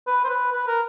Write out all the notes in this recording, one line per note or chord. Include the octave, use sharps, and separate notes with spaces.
B4
C5
B4
B4
A#4